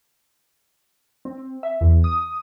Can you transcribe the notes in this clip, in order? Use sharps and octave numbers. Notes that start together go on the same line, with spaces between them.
C4
E5
E2
D#6